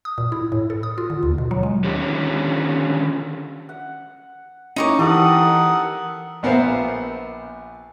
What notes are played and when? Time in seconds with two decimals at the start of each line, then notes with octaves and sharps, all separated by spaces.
0.05 D#6
0.18 A#2
0.32 E4
0.52 A2
0.70 A4
0.83 D#6
0.98 F4
1.10 D3
1.23 D#2
1.38 B2
1.51 F#3
1.63 G#3
1.84 D3 D#3 C#4 F4 G4 A4
3.69 F#5
4.76 C#4 D#4 E4 A#4 C#6 D6
4.99 E3 G4 A4 A#4 F#5 A#5 D#6
6.43 A#1 B3 A#4 C5 E5 F5